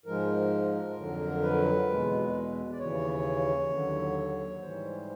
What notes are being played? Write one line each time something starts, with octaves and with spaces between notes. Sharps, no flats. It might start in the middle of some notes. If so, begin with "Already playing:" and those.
G#2 F3 G#3 A#4
F2 D3 F#3
B4
E2 B2 G#3
D5
D#2 C#3 E3 C#5
D#2 D3 F#3
G#2 E3 G3 C5